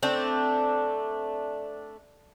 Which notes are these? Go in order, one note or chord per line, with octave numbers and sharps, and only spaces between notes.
A3 C4 D4